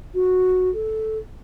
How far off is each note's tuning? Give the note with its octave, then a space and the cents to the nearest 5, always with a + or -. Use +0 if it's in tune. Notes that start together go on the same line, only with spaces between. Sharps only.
F#4 -10
A4 -10